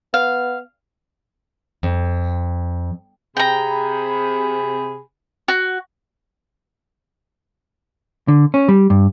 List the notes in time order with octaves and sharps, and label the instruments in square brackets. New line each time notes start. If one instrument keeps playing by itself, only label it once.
[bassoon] B3 [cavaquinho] F5
[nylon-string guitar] F2
[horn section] C3 G#4 B5 [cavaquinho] G5 A#5
[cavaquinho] F#4
[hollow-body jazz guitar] D3
C#4
G3
G2